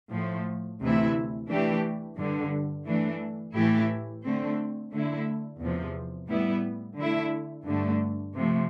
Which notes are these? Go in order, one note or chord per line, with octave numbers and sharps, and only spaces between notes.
A2 F3 A3
D2 C3 E3 A3 E4
E3 A3 D4 G4
G2 D3 G3
E3 A3 D4
A2 E3 A3 E4 G4
D3 A3 C4
D3 A3 E4
E2 C3 F3
A2 G3 B3 E4
D3 A3 E4
G2 D3 A3
C3 F3 A3